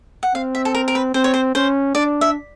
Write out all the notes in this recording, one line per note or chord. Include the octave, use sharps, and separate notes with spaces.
F#5
C4 F5
E5
A4
A#4
A#4
B4
C4 C5
C#5
C5
C#4 C5
D4 D5
E5